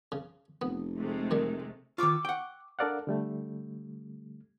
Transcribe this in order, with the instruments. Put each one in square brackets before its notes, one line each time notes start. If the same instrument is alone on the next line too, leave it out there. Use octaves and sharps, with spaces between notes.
[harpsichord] C#3
[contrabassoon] F1 [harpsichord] B3
[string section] C3 G#3 A3
[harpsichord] D#3 G3
[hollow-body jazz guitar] D#3 F4 [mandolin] C#6 D6 E6
[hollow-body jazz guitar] F#5 G5
[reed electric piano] D4 A4 A#4 D5 F5 F#5
D3 G3 A3